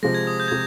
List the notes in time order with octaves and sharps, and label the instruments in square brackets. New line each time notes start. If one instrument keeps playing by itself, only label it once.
[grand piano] C3 F3 G#3 [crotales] A#6
[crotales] G#6
D#6
G6
G#6
[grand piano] C3